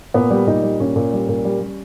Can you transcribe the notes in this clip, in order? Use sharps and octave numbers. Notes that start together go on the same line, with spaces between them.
A#2 B3
G3
A#2 D#4
G3
A#2 C#4
A#2
G3
A#2
G3
G3